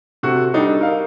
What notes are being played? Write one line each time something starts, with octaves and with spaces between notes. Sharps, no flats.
C3 F#4 A4
G3 D4 D#4 A4
A#4 F5